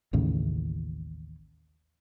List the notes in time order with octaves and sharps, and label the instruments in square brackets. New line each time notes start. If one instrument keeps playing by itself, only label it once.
[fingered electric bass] A1 D#2 A2 C#3